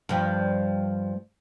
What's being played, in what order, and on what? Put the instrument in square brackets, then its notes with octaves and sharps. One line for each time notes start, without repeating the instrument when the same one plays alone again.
[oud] G2 F3